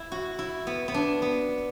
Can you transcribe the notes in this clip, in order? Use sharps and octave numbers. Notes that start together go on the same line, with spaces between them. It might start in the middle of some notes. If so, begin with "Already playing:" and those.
Already playing: E4
F#4
E4
B3
B3
D4
B3